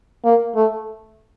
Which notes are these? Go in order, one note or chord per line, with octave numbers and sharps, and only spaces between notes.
A#3
A3